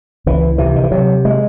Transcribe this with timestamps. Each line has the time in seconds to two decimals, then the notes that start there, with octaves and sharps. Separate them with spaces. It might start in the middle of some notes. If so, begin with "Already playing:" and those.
0.26 C#2 E3
0.58 C3 E3
0.76 D#3
0.84 E3
0.91 C3 F#3
1.25 G#3